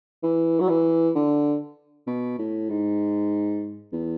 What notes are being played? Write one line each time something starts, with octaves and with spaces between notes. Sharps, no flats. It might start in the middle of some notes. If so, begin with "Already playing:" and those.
E3
F#3
E3
D3
B2
A2
G#2
E2